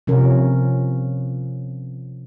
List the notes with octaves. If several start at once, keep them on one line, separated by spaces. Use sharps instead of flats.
C3 F3 C#4 A#4